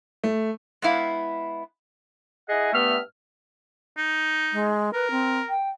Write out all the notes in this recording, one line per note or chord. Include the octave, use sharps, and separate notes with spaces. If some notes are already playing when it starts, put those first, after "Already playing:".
A3
G#3 B3 E4 F5
E4 G#4 D#5 F#5 G#5
G2 A3 B3 E5 F6
D#4
G#3
A#4 B4
C4
G5